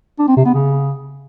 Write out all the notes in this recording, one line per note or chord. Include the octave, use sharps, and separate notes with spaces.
D4
C4
C3
B3
C#3